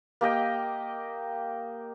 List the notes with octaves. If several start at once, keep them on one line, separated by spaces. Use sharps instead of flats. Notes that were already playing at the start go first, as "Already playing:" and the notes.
A#3 G4 D#5 G5